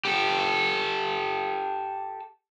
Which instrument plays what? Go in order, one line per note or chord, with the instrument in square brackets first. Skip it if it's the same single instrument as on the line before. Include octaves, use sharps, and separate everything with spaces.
[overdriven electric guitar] G4 A4